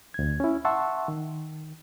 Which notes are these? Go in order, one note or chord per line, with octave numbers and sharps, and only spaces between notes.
D2 G#6
C#4 E4
E5 F#5 A5 C6 C#6 E6
D#3